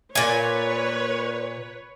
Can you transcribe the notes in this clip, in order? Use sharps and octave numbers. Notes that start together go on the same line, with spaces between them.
A#2 B4 C#5 G#5